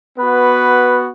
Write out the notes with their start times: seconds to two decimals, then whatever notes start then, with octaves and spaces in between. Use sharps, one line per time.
0.18 B3 F#4 B4